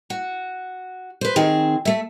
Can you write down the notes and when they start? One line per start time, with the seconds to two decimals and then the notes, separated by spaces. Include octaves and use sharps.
0.10 F#4
1.21 B4 C5
1.36 D#3 C4 G#4
1.85 A3 E5